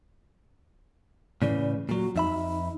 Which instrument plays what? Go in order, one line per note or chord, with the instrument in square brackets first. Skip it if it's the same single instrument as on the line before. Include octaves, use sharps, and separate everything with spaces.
[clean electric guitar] A2 C#3 E3 [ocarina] D5
[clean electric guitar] A#2 F#3 [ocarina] F#4
[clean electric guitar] F2 E5 B5 [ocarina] D#4